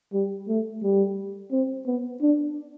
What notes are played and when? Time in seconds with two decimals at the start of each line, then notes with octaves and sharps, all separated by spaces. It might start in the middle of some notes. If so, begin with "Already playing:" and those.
0.13 G3
0.48 A3
0.82 G3
1.51 C4
1.86 B3
2.22 D4